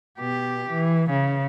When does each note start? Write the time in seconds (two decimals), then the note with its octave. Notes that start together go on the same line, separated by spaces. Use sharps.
0.19 B2 G4
0.70 E3
1.10 C#3